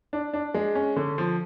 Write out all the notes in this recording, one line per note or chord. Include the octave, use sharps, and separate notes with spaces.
D4
D4
G#3
C#4
D3
F3